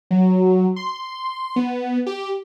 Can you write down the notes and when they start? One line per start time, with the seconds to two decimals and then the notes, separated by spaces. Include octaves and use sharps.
0.11 F#3
0.76 C6
1.56 B3
2.06 G4